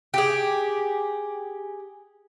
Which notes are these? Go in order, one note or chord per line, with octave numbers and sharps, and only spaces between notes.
G4 G#4